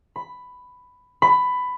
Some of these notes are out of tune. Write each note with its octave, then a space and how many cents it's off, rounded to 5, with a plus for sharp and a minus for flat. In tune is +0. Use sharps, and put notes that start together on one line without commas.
B5 +10
B5 +15